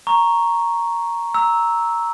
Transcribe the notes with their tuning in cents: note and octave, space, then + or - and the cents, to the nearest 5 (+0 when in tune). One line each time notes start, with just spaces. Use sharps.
A#5 +0 C#6 +0
A#5 +0 E6 -10